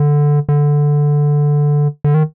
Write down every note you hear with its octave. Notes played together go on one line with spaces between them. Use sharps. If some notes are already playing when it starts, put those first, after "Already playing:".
Already playing: D3
D3
D3
D#3